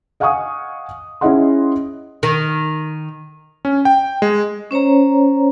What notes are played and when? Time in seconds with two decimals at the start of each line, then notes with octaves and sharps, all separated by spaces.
0.20 D#5 F5 F#5 G#5 C#6 D#6
1.21 C#4 E4 G#4 D#5 F#5 C6
2.23 D#3
3.65 C#4
3.85 G5
4.22 G#3
4.71 C#4 C5 C#5 A#5